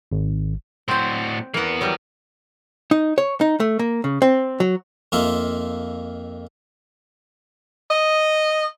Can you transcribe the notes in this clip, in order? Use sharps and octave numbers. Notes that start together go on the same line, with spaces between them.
G#1
A2 C4 F#4 C5
E3 A#3 B3 F#5
F#3 G3 A#3
D#4
C#5
D#4
A3
A#3
C#3
C4
F#3
F2 A#3 D#4 F4 E5
D#5